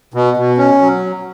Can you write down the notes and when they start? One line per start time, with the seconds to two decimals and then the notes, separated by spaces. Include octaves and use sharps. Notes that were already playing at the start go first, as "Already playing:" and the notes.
0.14 B2
0.37 B2
0.58 C#4
0.81 F#3